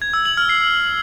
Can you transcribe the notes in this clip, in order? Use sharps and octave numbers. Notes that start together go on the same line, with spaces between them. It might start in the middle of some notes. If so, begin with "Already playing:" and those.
G#6
E6
F#7
F6
C7